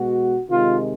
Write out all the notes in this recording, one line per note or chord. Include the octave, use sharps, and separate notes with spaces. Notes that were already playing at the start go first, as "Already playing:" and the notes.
Already playing: B2 G#3 F#4
C3 D#3 G#3 F4